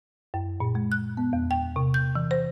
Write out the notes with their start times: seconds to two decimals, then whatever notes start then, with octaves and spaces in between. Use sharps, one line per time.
0.34 F#2
0.60 A#2
0.75 G#3
0.92 F#6
1.17 B3
1.33 E2
1.51 G5
1.76 C3
1.94 G6
2.15 E3
2.31 C5